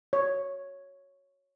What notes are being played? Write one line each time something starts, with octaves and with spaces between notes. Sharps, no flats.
C#5